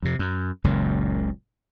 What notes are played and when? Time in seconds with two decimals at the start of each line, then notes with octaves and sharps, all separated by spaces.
0.02 F2 C3
0.19 F#2
0.64 F#1 C#2 F#2 A#2